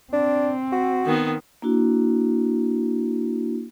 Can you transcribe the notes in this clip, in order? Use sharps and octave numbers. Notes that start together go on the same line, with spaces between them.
C4 D4
F#4
D#3 B3
A#3 D4 E4 F#4